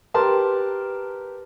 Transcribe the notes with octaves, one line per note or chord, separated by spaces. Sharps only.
G4 A#4 B4 A5 C6